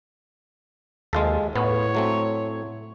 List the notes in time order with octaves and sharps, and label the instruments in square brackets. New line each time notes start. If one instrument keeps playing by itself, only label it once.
[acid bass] D#2 [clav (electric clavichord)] G#3 F4 A4
[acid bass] A2 [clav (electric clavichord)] B3 [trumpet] C#5
[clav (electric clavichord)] F#3 A3 C4